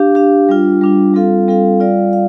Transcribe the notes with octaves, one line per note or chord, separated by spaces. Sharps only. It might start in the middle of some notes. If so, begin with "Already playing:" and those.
Already playing: D4 G4 F5
D4 G4 F5
G3 D4 F4
G3 D4 F4
G3 C4 F4 A4 F5
G3 C4 F4 A4 F5
G3 F4 D5 F5
F5